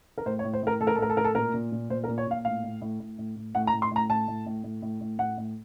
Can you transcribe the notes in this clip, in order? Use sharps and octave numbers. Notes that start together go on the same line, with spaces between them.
A#4
A2 C5
C#5
A2
C5
A2 A#4
A2 A4
A#4
A4
A2 A#4
A4
A2 A#4
A4
A#2 A#4
A#2
A#2
A#2 C5
A#4
A#2
C#5
A#2 F5
A2 F5
A2
A2
A2
A2
A2
A2 F#5
A#5
A2
C6
A2 A#5
A2 A5
A2
A2
A2
A2
A2
A2 F#5
A2